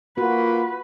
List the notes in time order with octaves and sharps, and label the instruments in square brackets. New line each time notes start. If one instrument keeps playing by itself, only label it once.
[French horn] A#3 [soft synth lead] F4 [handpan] F#4 [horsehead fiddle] B4